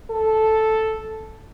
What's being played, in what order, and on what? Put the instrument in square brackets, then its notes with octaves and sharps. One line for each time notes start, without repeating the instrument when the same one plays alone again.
[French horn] A4